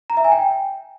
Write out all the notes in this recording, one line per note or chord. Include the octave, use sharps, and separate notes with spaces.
A#5
E5
G#5
G5